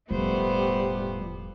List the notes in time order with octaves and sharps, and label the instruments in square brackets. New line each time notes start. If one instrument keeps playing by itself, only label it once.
[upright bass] E1 [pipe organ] A2 F3 [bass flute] G3 [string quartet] A3 B3 C5